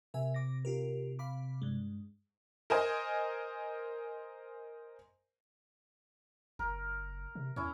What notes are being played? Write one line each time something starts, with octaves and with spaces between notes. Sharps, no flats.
C3 A#4 E5 G#5
D6 A#6
F4 G4 A#4
F5 B5 D6
G2 G#3
A#4 C5 D#5 G#5
F#1 A#4
C3
E2 C#4 E4